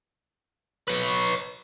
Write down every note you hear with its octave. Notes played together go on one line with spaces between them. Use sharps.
B4 C#5